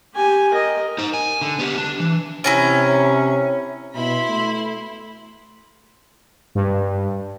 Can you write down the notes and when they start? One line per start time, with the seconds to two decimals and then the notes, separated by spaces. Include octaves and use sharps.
0.15 G4 G#5
0.52 A#4 D#5
0.98 D#4 C5
1.14 G#5
1.41 D3
1.59 B3 G4
1.77 D4
2.00 E3
2.44 C3 C#4 E4 C#5 G#5 A#5
3.95 B2 E4 B5 C6
4.27 A3
6.55 G2